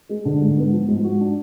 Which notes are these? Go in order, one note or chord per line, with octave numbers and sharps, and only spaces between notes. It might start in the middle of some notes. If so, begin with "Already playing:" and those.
G#3
D3
G#2
B3
F3
G#2
F#4
D4